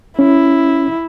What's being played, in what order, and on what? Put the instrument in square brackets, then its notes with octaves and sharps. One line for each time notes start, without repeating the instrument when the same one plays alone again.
[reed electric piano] C#4 [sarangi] E4